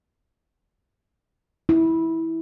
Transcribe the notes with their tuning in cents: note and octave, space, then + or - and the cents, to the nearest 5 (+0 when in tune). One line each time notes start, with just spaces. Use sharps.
E4 -15